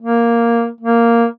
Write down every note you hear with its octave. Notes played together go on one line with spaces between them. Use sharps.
A#3
A#3